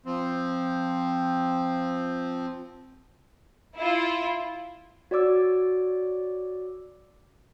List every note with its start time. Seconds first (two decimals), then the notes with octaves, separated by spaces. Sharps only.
0.06 F3 C4
3.78 E4 F4
5.11 F#4 C#5 D5 D6 E6